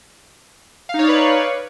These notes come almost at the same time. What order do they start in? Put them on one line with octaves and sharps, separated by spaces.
F5 D#4 C#5 D5 B4